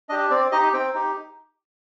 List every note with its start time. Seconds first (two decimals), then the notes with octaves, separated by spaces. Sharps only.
0.09 D4 G4 D#5
0.31 C4 D5
0.52 D#4 G4 D#5
0.73 C4 G5
0.94 D#4 G4